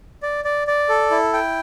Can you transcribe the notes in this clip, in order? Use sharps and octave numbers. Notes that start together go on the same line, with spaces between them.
D5
D5
D5
A4
E4
G5